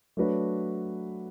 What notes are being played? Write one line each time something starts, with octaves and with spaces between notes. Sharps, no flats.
F#3 A3 D4 F#4 B4